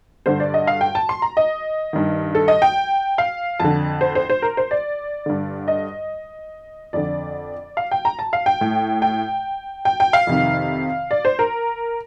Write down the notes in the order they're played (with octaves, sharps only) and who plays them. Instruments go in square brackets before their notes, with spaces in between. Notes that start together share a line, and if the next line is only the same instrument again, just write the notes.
[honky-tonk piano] G2 D3 C5
D5
D#5
F5
G5
A5
C6
A#5
D#5
G2 D#3
A4
D#5
G5
F5
F2 D3 A5
C5
C5
C5
A#4
C5
D5
G2 D3
D#5
F2 D3 D5
F5
G5
A#5
A5
F5
G5
A2
G5
G5
G5
F5
F2 C3 D#3
D5
C5
A#4